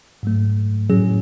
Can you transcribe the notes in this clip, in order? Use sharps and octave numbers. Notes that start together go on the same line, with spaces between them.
G#2 F#3 A3
A2 F#3 C#4 G#4